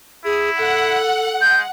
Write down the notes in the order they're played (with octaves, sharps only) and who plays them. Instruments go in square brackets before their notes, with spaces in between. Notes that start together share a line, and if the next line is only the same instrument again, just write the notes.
[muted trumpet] E4 [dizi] G#4
[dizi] A4 [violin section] F#5
[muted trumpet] G#3 [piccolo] G6